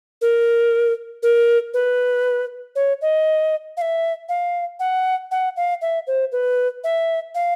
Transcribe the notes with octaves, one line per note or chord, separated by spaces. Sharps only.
A#4
A#4
B4
C#5
D#5
F5
E5
F5
F#5
F#5
F5
E5
C5
B4
E5
F5